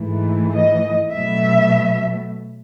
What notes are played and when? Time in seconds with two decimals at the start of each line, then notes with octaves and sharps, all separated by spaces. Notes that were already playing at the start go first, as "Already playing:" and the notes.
Already playing: G#2 E3 A3
0.54 D#5
1.14 B2 F#3 A3 E5